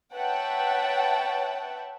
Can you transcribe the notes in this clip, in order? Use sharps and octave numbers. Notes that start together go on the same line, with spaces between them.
B4 C#5 E5 F#5 G5 A5